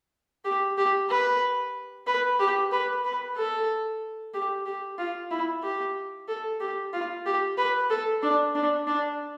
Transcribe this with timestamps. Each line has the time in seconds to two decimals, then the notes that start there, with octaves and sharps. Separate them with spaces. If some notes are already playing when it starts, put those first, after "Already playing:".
0.45 G4
0.78 G4
1.10 B4
2.07 B4
2.40 G4
2.72 B4
3.04 B4
3.37 A4
4.34 G4
4.66 G4
4.99 F4
5.31 E4
5.63 G4
6.28 A4
6.60 G4
6.93 F4
7.26 G4
7.58 B4
7.90 A4
8.23 D4
8.55 D4
8.87 D4